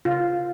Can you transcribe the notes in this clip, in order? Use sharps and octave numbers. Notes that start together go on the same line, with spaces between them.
C#3 F4